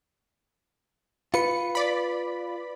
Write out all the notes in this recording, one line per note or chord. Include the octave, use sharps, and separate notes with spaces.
F4 B4 C#7
D5 B5